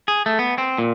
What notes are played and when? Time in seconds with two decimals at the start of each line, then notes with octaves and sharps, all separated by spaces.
0.08 G#4
0.26 A3
0.39 B3
0.58 C4
0.78 A#2